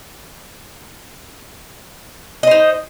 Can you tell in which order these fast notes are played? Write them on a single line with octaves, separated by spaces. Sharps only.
D#5 C5 D#4